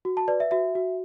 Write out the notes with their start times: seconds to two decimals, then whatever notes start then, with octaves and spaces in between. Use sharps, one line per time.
0.05 F#4
0.17 A5
0.28 B4 D5
0.40 E5
0.51 F#4 E5
0.75 F#4